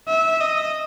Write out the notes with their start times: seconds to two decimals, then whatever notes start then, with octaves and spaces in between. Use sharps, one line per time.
0.08 E5
0.40 D#5